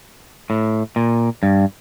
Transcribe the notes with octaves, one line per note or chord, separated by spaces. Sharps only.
A2
A#2
G2